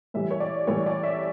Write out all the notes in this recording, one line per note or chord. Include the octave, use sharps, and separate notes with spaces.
A2 E3 G3 E5
C#5
D5
A2 E3 G3 C#5
D5
E5